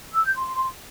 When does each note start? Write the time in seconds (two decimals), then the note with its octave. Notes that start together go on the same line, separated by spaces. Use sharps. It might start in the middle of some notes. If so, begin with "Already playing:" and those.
0.13 E6
0.25 G6
0.37 C6